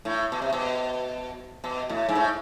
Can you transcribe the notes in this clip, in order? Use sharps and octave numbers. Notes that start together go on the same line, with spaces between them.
A2
B2
C3
B2
B2
A2
G#2
A2